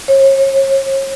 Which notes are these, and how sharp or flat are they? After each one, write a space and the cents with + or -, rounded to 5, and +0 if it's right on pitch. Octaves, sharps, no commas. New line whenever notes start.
C#5 -40